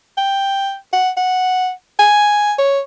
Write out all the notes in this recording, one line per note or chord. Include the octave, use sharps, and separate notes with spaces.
G5
F#5
F#5
G#5
C#5